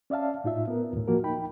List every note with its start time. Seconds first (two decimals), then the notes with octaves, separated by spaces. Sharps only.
0.10 C#4 D5 E5 F5 A5
0.44 A2 D#4 F4 E5
0.67 B3 A#4
0.93 D#2 A2
1.08 F3 A#3 F#4 A#4
1.23 D#4 G5 B5